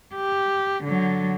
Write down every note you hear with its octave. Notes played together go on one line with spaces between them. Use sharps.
G4
D3 F#3